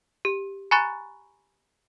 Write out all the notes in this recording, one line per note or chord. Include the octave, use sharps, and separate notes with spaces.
G4
G#5 A#5 B5 C#6 F#6 A6